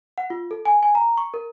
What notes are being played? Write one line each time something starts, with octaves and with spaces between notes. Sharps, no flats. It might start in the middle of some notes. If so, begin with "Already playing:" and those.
F#5
F4
A4
G#5
G#5
A#5
C#6
A#4